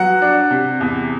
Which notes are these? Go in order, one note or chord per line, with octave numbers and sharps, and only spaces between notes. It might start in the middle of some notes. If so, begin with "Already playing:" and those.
Already playing: F#3 B3 F#5
D4
C3
E2